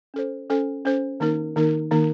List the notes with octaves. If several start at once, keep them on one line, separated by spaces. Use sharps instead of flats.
C#4 A4 C5
C#4 A4 C5
C#4 A4 C5
D#3 A#3 D#4 A#4
D#3 A#3 D#4 A#4
D#3 A#3 D#4 A#4